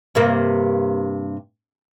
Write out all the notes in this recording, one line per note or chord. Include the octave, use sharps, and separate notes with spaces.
G2 C3 A#3